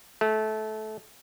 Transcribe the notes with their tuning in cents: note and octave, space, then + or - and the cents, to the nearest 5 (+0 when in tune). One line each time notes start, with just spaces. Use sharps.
A3 -20